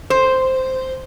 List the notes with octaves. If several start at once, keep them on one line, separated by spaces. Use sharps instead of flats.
C5